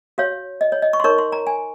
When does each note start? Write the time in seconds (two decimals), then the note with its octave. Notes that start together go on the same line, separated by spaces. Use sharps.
0.18 F#4 C#5 F5
0.61 D#5
0.72 C#5
0.82 D#5
0.93 C#6
1.00 C6
1.04 D#4 A#4 C#5 C#6
1.18 C6
1.32 A#5
1.47 G#5